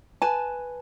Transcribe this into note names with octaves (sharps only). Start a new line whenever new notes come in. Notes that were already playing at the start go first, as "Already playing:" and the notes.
B4 G#5 A5